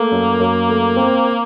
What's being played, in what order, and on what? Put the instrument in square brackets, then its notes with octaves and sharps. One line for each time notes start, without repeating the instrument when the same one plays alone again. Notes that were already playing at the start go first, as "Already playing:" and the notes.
Already playing: [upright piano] A3 [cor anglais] A#3
[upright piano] F#2
F#2
A3
C4